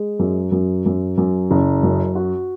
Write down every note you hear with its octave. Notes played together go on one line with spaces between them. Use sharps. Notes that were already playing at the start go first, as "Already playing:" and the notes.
Already playing: G#3
F#2
F#2
F#2
F#2
F#1
F#2
F#4